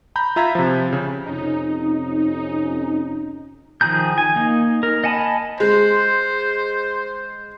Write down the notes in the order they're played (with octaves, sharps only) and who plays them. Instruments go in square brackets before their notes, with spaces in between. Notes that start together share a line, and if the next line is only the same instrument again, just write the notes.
[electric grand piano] A#5 B5 G6
F4 E5 A#5 B5 G#6 B6
C3 F3
C#3
[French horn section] F2 C3 C#4 [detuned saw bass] D#4
[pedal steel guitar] D#3 F3 G#4 A#5 G6
G#5
A#3 D#4
A#4
D#5 F#5 G#5 A5 B5
[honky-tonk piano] G#3 [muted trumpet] C5